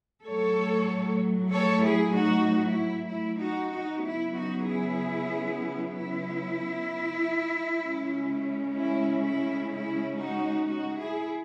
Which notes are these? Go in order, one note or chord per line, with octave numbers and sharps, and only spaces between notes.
A2 F#3 A3 A4 C#5
A4 C#5
E4 G#4
D#4 F#4
E4
E4
D#4 F#4
D#4 F#4
C#3 F#3 B3 E4
D#4 F#4
E4 G#4
E4
C#3 G#3 C#4
E4
E4
E4
D#4 F#4
D#4 F#4
E4 G#4